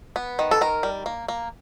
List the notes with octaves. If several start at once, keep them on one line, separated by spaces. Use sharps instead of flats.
B3
D#3
A4
D#3 A#4
G3
A#3
A#3